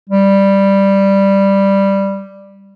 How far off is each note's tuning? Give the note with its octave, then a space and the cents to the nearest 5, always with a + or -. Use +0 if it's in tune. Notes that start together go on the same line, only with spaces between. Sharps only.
G3 +5